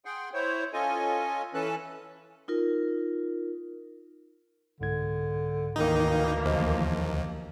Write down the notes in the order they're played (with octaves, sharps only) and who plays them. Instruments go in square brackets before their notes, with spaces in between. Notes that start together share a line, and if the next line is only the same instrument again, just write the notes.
[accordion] G#4 F#5 G5 C6
E4 C5 C#5
C#4 F4 A4 D#5 G#5
E3 C#4 A4 B4 A5 F#6
[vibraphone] D#4 F4 A#4
[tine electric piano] C2 G#2 G#6 [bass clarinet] D3
[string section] D2 E3 A#3 [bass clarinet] D#3 [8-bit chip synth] D#4
[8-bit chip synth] D#2 [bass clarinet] F3 [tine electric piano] C5 D#5